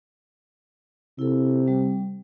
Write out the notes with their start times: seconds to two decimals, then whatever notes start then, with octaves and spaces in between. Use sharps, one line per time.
1.19 C3 E4 A4
1.68 G3